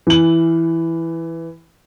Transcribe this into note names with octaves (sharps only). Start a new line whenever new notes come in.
E3 F#7